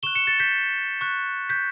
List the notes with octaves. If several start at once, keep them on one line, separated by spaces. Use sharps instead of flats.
C#6 F#6 E7 G7
C#7 E7
A6 C#7
G6 B6
C#6 F#6
G6 B6